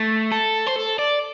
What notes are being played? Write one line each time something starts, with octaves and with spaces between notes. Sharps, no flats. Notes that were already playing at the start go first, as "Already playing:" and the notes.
Already playing: A3
A4
C5
A4
D5